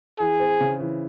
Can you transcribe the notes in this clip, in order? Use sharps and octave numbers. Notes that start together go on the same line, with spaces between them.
E3 G#4
C4
C#3
E3